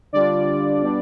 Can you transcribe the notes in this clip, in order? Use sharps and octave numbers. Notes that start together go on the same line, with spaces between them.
D3 G3 D4 F4 D5
B2 G3 D4